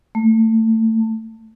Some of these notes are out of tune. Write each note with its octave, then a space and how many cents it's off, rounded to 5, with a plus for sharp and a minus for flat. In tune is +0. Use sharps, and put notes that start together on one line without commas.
A3 +25